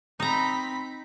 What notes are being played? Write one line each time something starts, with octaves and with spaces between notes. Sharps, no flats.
C4 D#4 A#5 B5